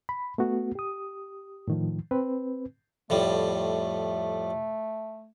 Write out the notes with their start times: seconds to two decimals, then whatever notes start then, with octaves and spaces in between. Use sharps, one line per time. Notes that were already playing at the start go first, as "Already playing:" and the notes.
0.09 B5
0.38 A3 B3 F#4
0.75 G4 D#6
1.68 A2 D#3 F3
2.11 C4 B4
3.10 F2 A2 G3 A3